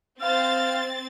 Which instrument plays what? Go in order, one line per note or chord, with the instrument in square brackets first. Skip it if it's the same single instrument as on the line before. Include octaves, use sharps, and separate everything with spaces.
[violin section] C4 A6 [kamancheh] C5 F5